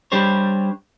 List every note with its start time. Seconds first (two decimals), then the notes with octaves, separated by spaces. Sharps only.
0.12 G3 D4 G4 C5 C#5